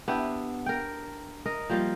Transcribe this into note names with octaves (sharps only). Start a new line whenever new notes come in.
B3 D4 E4 G4
A#4 G5
A#4 D#5
F3 G3 A#3 F4